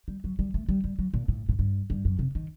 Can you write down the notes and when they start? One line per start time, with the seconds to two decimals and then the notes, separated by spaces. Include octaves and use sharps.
0.08 G3
0.24 F#3
0.39 G3
0.54 A3
0.69 G3
0.84 G3
0.99 F#3
1.14 A#2
1.28 A2
1.49 A2
1.59 G2
1.90 G2
2.05 F#2
2.19 C3
2.35 D#3